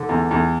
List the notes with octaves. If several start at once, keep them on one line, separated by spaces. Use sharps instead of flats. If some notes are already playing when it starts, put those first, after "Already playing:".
Already playing: D3
E2
E2